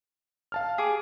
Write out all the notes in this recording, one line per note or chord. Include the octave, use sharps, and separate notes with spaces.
F5 A5 F6
G#4 D6